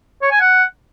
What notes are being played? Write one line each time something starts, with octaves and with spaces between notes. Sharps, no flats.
C#5
G#5
F#5